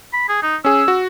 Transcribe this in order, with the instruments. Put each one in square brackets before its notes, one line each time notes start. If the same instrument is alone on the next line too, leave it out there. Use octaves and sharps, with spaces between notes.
[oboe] B5
G#4
D#4
[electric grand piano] C#4 G#4 [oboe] E6
[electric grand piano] F#4